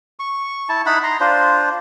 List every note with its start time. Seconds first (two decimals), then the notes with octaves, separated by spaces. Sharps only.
0.19 C#6
0.69 E4 A5
0.86 D#4 E4 F#5 B5
1.04 A#5 C6
1.20 D4 F4 C5